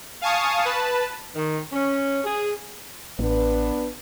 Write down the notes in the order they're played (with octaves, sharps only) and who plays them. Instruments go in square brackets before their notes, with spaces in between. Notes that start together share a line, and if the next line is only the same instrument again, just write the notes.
[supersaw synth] F5 G#5 A5 C#6 D#6
B4 A5
[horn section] D#3
C#4
G#4
[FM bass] A1 [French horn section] B3 D4 B4